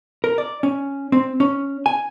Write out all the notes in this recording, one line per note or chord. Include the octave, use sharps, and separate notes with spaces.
A#4
D5
C#4
C4
C#4
G#5